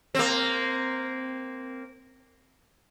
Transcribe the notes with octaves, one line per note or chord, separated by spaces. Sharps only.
A#3 C4